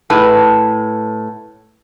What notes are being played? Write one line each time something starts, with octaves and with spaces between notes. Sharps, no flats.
A2 G#4 B4 A5